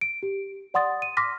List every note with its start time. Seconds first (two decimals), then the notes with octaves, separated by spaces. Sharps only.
0.01 D7
0.23 G4
0.74 D5 F#5 C6 D#6 A6
1.02 D#7
1.17 C6 D6 F6 A#6 B6